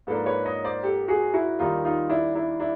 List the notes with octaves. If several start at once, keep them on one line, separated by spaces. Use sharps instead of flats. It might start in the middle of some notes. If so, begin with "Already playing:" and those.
G#2 F3 A#3 D4 A4 B4
B4 C#5
C#5 D#5
C5 D5
G4 A4
F#4 G#4
E4 F#4
D#2 D#3 G3 A#3 D#4 F4
D#4 F4
D4 E4
D4 E4
D4 E4